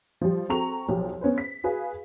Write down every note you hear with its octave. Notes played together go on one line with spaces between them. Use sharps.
F3 G3
C4 F#4 A4 A#5 C#6 F7
B1 F3 G4
B3 C#4 B4 C5
B6
F#4 G#4 B4 F5